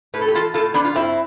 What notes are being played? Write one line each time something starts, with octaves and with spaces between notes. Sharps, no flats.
A2 B4
A4
G4
E3 F4 A4
A2 F4 A4
F3 B3 D4
F4
G2 C4 E4